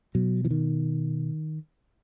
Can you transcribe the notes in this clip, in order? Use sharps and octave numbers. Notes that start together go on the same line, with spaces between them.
B2 F#3
E3
D#3